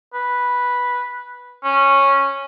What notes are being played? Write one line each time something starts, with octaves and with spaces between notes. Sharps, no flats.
B4
C#4